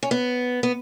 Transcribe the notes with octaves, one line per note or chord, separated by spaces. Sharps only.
C#4
B3
B3